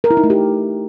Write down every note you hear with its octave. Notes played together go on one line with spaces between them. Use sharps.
A#4
E4
D#4
A3
G4